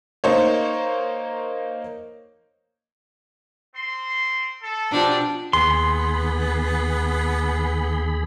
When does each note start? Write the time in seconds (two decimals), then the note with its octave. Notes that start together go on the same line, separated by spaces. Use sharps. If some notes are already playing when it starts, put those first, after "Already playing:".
0.24 A#3 D#4 C5 C#5
3.75 C4 C6
4.62 A4
4.91 B2 F3 D4 G4
5.53 D#2 B3 G#4 B5 C6